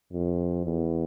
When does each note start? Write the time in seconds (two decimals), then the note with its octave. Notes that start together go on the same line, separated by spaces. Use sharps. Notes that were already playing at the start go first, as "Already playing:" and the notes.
0.13 F2
0.66 E2